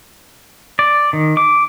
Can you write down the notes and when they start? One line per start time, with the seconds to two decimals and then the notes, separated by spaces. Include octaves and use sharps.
0.79 D5
1.13 D#3
1.37 D6